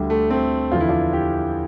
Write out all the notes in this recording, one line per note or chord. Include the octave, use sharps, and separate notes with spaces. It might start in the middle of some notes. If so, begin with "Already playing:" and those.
Already playing: D2 D3 G3
A3
A3 C4
E2 D3 F3 F4
E4
D4 F4
E4 G4